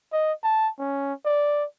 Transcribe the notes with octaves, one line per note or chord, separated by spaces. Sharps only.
D#5
A5
C#4
D5